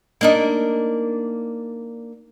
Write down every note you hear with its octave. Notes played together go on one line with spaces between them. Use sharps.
A#3 D4 D#4